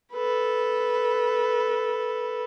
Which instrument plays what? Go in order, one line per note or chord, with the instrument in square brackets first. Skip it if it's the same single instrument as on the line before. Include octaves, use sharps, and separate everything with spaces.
[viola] A4 B4